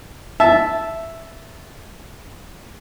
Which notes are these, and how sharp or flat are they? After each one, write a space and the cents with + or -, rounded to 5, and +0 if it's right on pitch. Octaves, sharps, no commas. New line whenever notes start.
E5 +0 A5 -10